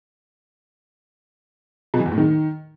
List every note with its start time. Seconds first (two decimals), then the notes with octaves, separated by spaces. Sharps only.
1.94 B2
2.00 E3
2.06 E2
2.12 A2
2.18 D#3